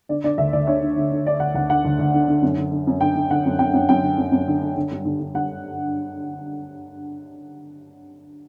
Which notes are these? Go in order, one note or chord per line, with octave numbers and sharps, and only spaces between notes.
D3 D5
D3 D5
D2 E5
D2 D5
D3 C#5
D3
D3
D3
D3 D5
D3 F#5
D2 F#5
D3 F#5
D2
D2
D3
D3
F#2
D3
D3
F#2
D3 G5
D3
D3 F#5
F#2
F#2 G5
F#2
F#2 G5
D3
F#2
F#2
D3
D3
D3
G2
D3
D3
D3 F#5